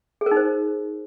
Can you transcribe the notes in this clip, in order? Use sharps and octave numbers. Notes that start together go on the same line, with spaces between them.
G#4
A#4
D#4
C5